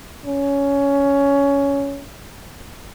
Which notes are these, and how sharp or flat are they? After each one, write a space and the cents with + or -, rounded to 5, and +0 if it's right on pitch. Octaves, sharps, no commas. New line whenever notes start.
C#4 +15